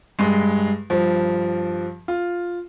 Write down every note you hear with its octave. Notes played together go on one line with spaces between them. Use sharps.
G2 G#3
G2 F3
F4